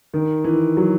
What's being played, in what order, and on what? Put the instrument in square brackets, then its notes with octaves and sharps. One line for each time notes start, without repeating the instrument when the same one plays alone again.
[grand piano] D#3
E3
F#3